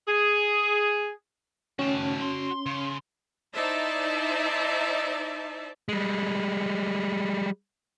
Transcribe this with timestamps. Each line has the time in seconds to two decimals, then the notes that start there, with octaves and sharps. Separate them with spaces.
0.08 G#4
1.79 D#3 A3 C#4 F#4 A5
2.22 C6
2.66 C#3
3.54 D#4 E4 C5 D5 E5 A5
5.89 G3 G#3